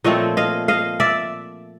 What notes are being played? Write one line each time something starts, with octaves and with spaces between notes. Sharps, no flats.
A#2 F3 A3 C4 C#5 D#5
D#5 F5
D#5 F5
D5 E5